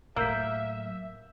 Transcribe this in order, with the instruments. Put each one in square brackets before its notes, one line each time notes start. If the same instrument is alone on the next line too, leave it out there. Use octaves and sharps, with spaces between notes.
[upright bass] A2 F#3 [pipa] A#3 [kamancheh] E5 [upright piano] E6 G6 B6